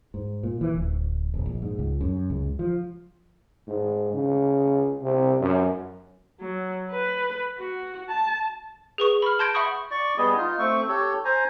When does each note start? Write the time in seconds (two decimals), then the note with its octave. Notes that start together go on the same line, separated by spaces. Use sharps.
0.14 G#2
0.43 A#2
0.61 E3
0.75 D1
1.34 E1
1.46 A#1
1.62 G#2
1.79 C#2
2.01 F#2
2.30 C#2
2.59 F3
3.67 G#2
4.13 C#3
5.02 C3
5.40 F#2
6.40 F#3
6.91 B4
7.58 F#4
8.09 A5
8.98 G#4 B4 C#6
9.22 B5 F6
9.39 A5 C6 G6 G#6 A#6 D7
9.54 E5 F#5 B5 C#6 D#6
9.91 D5 C#6
10.18 G3 B3 G#4 D#5
10.37 D#4 F4
10.59 A3 C4 C#6
10.89 G4 A4 C#5
11.25 C5 G#5 A#5